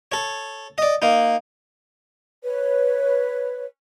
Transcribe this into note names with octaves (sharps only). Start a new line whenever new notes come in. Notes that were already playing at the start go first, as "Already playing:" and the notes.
A4 C#5
D5 D#5
A#3 D#4
B4 C#5